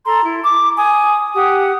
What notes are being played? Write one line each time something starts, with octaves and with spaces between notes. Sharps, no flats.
A4 A#5 C6
E4
D6
G#5 D#6
G4 F#5 D#6